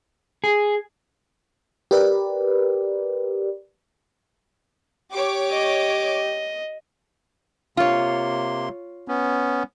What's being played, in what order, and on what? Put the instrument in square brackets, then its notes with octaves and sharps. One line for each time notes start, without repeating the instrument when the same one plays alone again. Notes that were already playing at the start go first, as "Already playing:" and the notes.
[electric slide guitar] G#4
[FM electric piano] G4 A#4 B4 D5
[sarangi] G4 [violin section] C#5 D6
[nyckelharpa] D#5
[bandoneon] C3 A#3 C6 [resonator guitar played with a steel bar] F4 C#5
[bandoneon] B3 C#4